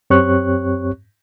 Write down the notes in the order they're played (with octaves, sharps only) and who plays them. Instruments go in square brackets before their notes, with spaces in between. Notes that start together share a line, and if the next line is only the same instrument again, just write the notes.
[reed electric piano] F#2 C4 G4 C#5 C#6 F#6